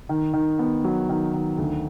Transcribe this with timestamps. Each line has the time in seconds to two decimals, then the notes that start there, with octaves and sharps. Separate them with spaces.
0.09 D#3
0.33 D#3
0.59 B3
0.84 F#3
1.09 D#3
1.33 D#3
1.58 D2